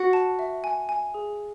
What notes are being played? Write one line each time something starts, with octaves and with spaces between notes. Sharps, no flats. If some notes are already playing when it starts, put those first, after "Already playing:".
Already playing: F#4
A5
E5
G#5
G#5
G#4